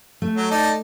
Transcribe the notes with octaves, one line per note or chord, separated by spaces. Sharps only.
A3
F#3
D#4 D5 A5